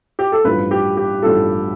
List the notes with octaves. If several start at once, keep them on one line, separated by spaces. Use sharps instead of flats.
G4
A4
A1 G2 F3 B4
G4
G4
A1 G2 F3 A4